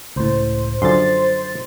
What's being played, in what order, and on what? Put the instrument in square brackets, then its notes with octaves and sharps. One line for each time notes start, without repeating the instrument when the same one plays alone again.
[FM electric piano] C#2 A2 [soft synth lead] C5
[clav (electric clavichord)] F#2 D3 F3 [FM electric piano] C6 A6